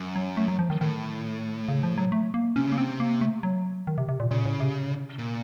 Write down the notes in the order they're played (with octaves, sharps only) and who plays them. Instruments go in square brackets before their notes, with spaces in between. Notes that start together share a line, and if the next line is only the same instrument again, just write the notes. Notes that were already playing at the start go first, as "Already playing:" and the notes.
Already playing: [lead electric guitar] F#2
[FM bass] F#3
A3
F#3
F3
D#3
[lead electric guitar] A2 [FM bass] D#3
[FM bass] C#3
F3
F#3
A3
A#3
[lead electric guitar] C3 [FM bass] C#4
[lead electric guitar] C#3
[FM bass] A#3
[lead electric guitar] C3 [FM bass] C4
[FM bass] A#3
A3
F#3
D#3
C3
C3
A#2
[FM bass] A#2 [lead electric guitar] C#3
[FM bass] A2
C3
[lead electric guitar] A#2